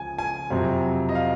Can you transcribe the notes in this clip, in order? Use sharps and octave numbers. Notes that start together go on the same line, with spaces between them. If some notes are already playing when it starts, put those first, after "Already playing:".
Already playing: C#2 C#3 F3 G#5
G#5
F2 C3 F#3
D#5
F5